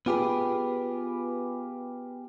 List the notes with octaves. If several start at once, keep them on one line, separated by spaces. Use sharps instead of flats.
B3 F4 G4 G#4 B4